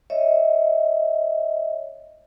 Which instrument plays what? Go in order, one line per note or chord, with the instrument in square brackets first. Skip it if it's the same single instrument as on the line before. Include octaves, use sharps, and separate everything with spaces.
[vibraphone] C#5 D#5 E5